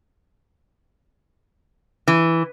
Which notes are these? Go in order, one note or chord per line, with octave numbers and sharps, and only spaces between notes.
E3